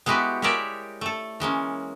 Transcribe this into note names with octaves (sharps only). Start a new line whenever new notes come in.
G#3 B3 E4 F#4 G4 B4
G#3 G4 A#4 C#5 D5 E5
A3 A4
E3 G#3 A#3 C#4